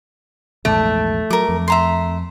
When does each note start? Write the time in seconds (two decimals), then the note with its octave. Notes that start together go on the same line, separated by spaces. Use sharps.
0.65 A#1 E2 G#2 A3
1.30 F#3 A#4 D6
1.49 F2
1.68 E5 A#5 C6